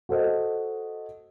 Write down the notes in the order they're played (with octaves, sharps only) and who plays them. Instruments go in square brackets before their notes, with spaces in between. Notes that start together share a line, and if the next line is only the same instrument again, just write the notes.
[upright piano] F#4 A4 C5 D#5